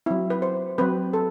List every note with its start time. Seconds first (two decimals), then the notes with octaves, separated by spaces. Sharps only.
0.06 F#3 C4 E4
0.30 B4
0.42 C5
0.78 F#3 C4 B4
1.14 A4